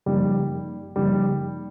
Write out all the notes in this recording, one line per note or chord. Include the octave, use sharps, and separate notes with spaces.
F#2 C#3 F3 G3 A#3 D#4
F#2 C#3 F3 G3 A#3 D#4